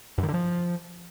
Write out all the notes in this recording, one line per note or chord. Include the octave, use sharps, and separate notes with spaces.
F#2
D#3
D3
F3